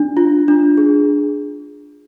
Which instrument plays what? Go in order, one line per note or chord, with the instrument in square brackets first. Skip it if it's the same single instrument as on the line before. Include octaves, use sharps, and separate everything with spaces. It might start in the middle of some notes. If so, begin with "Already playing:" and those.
Already playing: [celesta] D4
F4
D4
G#4